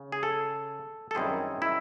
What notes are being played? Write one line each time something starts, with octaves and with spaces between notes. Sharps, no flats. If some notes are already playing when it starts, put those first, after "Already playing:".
Already playing: C#3
G#4
A4
A4
F#2 D#3 G3 C4 E4 G#4
E4